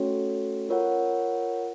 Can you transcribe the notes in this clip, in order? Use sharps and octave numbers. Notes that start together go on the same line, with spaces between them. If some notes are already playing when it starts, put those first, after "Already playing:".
Already playing: A3 C#4 F#4 A4 C#5
F4 A#4 C#5 F#5